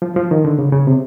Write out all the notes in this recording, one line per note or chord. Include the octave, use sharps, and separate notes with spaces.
F3
F3
D#3
D3
C#3
C#3
C3